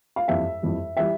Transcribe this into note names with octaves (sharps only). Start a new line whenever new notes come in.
F5
F2 E3 G3 E5
F2 E3 G3
E3 G3 E5